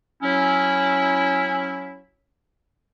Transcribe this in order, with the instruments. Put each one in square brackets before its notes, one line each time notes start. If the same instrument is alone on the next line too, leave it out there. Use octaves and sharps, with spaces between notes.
[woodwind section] F#3 C#4 E4